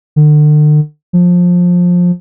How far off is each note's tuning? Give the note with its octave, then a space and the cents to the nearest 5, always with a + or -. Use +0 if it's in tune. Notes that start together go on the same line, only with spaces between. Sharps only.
D3 +40
F3 +20